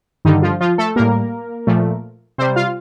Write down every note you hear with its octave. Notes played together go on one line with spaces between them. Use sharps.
G2 D3 D#3 G3 D#4
F3 F4
F3 F4
A3 A4
A2 G3 A#3 A#4
A#2 F3 A3
C3 G3 C4 C5
F4 F5